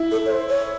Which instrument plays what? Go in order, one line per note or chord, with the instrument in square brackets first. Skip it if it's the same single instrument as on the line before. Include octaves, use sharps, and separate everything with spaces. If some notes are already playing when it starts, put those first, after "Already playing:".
Already playing: [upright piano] E4
[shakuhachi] A4
C#5
C5
C#5